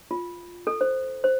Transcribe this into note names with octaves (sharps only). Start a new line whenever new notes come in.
F4
A4
C5
C5